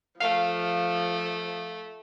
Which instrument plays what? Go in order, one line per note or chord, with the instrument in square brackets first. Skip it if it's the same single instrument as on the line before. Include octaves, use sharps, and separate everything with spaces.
[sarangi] F3 [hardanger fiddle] A3 [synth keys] F5